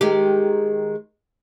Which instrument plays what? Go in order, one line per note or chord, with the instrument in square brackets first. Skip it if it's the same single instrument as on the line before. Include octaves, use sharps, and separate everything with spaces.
[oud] D#3 G#3 G4